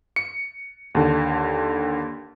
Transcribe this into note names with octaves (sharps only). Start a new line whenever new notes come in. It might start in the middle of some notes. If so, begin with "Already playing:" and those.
C#7
D#2 D3